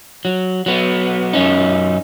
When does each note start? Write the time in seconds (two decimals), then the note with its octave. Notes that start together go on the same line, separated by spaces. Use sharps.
0.25 F#3
0.66 F#3 B3
1.33 F#2 C#4 D#4